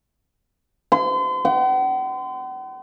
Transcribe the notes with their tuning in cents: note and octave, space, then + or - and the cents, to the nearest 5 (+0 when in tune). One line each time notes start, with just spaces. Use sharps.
C6 -40
F#5 +45